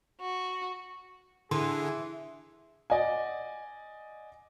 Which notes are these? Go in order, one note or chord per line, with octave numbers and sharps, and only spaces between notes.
F#4
D3 E3 G#4 C6
D5 D#5 F#5 G#5